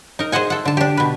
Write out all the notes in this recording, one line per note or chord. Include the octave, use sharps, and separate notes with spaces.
D#4 A#4
G#4 C5 D#5 F#5 G#5
A4 F#5
D3 A5
D4 G4
B2 B4